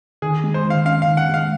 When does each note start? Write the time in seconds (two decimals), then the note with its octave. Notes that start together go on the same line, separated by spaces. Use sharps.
0.22 D#3 G#4
0.44 G#3
0.54 C5
0.65 D#3
0.70 F5
0.86 C#4 F5
1.02 F5
1.08 D#3
1.17 F#5
1.29 G#3
1.34 F5